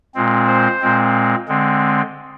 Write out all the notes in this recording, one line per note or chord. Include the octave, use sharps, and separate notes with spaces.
A#2 G#3 C4
C5
A#2 G#3 C4
D3 G#3 C4